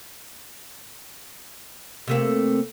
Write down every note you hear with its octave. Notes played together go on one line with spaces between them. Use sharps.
C3 A3 A#3